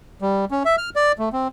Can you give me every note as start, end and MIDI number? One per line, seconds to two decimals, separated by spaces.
0.21 0.45 55
0.51 0.63 61
0.65 0.76 76
0.78 0.90 89
0.96 1.12 74
1.19 1.29 57
1.33 1.48 60